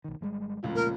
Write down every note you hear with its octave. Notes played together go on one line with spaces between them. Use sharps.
B1 D#3
G#1 G3 G#3
F1 C#2 F3
A#2 A#4